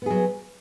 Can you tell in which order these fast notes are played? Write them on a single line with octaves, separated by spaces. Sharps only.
B3 G#4 F#3